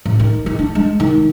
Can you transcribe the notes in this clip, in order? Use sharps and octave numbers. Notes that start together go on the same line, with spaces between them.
A1
D#3
D#3
D4
G#3
D#3